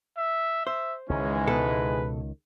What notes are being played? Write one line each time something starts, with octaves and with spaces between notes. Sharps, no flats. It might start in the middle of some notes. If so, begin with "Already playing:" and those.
E5
C5 E5
C#2 G#2 D#3 E3 G#3 C#4
B2 A4 B4